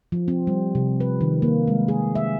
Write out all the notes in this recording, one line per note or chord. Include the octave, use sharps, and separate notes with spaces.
F3
C4
G3
C3
B4
D#3
A#3
G#3
G#4
E5